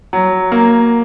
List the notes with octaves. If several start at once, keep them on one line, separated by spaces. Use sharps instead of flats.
F#3
A#3